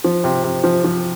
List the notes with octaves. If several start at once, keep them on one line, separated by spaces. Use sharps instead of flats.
F3
C3
C3
F3
F3